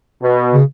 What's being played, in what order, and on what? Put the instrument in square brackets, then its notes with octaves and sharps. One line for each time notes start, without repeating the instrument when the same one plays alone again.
[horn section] B2
[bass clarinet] C#3